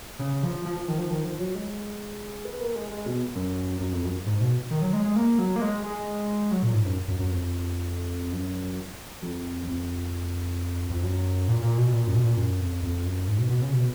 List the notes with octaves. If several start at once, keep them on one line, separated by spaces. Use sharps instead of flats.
C#3
F3
F3
F3
D#3
F3
D#3
F3
F#3
G#3
B3
A#3
G#3
G#3
B2
F#2
F#2
F2
F#2
G#2
B2
D#3
F#3
G#3
G#3
A#3
F#3
A#3
G#3
G#3
F#3
A#2
G#2
F#2
F#2
F#2
F2
F#2
F2
F2
F2
F#2
A#2
A#2
B2
A#2
F#2
B2
A#2
F#2
F2
F2
F#2
G#2
B2
B2
C#3
B2